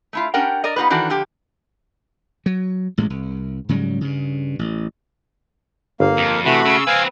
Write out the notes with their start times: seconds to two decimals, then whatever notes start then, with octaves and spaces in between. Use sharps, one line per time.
0.13 A3 E4 F4
0.34 C#4 D4 G4 A#4 F#5 G5
0.64 A#4 D5 D#5
0.76 B3 D#4 F4 G4 B4
0.90 D#3 E3 D4 F#4 A4
1.10 D3 F3 G4
2.46 F#3
2.98 A1 A2 G#3
3.10 C2
3.69 G#2 C#3 F#3 G3
4.01 G2 C#3
4.59 A1
6.00 G1 A#3 F5
6.17 F2
6.45 C3 E3 A3 F#4 B5
6.65 C#3 E6
6.87 C4 B4 F5 G#5